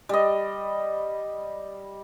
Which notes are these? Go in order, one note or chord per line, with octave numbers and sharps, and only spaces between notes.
G3 D#5